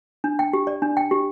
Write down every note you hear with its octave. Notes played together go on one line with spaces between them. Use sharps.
D4
G5
G4
D5
D4
G5
G4